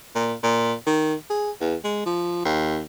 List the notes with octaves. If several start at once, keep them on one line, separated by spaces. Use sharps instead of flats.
A#2
A#2
D#3
G#4
E2
G#3
F3
D#2